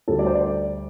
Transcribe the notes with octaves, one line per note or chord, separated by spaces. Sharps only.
D2 D3 G3 A4
D5
C5
D5